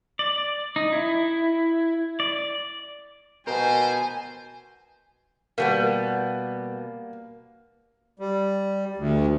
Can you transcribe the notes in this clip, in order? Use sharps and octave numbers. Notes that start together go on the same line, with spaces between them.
D5
D#4
E4
D5
B2 A#4 C5 G#5
B2 G3 A#3 B3
G3
D2